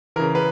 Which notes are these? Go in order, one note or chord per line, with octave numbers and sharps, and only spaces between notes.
C#3 E3 A#4
B4